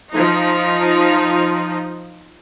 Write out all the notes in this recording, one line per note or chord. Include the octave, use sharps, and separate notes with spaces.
F3 D#4